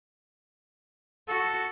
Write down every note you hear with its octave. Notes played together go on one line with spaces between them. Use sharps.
F#4 A4